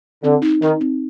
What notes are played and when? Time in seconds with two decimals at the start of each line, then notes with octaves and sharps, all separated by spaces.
0.23 D3 C4
0.42 D#4
0.61 D#3 D#4
0.81 C4